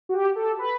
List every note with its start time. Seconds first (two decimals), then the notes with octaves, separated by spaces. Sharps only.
0.09 F#4
0.14 G4
0.36 A4
0.59 B4